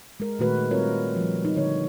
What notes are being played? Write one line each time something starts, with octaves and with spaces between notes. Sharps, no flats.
G#3 A#4
A#2 D#3 A3 F#4 B4
G3 C4 F4 A#4 C#5
F3 G3
D#4
D3 C#5